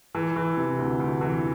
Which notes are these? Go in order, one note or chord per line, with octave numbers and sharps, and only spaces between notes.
E3
E3
C3
D2
D2
E3